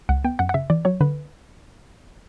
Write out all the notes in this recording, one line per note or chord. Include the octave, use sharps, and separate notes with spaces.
C#2 F#5
B3 G5
F#2 F#5
F#5
C#3 E5
E3 D5
F#3 C#5
D3 B4